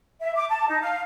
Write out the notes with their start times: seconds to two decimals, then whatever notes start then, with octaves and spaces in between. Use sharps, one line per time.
0.20 E5
0.35 D6
0.49 A5
0.68 D#4
0.81 F5